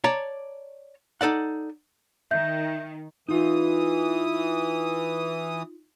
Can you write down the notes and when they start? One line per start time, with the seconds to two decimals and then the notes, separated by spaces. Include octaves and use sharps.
0.04 C#5 D5 A5 A#5
1.21 D#4 A4 D5 F#5
2.31 D#3 E5 G6
3.29 E3 D#4 F4 D#6